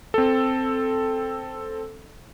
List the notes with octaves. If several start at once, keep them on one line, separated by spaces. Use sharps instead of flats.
C4 A4